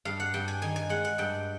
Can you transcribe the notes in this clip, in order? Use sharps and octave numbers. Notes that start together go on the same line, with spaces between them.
G2 F5
F#5
G2 G5
G#5
D#3 G#5
G#5
G#3 F#5
F#5
G2 G5